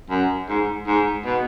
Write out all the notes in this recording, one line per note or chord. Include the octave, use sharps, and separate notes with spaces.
F#2
G#2
G#2
B2